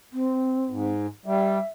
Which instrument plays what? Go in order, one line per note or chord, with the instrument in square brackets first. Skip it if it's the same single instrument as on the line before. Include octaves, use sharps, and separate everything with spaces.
[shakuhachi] C4
[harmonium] G#2
[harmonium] G3 [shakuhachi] E5